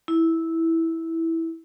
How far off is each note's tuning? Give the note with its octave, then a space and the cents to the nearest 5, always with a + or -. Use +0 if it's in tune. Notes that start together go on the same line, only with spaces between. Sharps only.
E4 -10